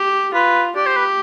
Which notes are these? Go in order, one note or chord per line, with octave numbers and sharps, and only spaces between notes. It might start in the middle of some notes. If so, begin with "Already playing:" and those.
Already playing: G4
F4 B4
G4 D5
C5
B4